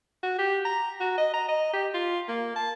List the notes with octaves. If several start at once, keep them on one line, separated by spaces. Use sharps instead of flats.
F#4
G4
A#5
F#4
D#5
A#5
D#5
G4
F4
A#3
A5